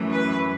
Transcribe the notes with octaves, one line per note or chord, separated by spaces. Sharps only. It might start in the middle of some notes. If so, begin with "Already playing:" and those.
Already playing: F#2 E3 A3
B4